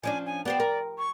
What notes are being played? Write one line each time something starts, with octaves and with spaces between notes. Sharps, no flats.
F3 C#4 D4 G#5
G#5
B3 G4 C5 D5
A#4
C#6